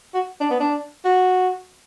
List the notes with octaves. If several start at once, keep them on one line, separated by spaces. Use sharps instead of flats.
F#4
D4
B3
D4
F#4